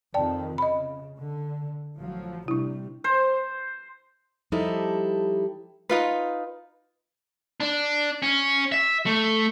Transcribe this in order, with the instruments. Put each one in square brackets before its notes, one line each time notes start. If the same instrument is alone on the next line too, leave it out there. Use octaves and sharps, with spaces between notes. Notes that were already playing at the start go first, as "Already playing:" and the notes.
[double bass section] F2 D#3 [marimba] D5 G5 A5
[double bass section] C#3 [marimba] D#5 B5
[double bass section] D3
A1 F3 F#3
[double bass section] C3 G3 [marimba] D4 E4
[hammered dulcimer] C5
[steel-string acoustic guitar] F3 G3 D#4 E4 G4 A4
[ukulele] D#4 F4 B4
[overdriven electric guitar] D4
C#4
E5
A3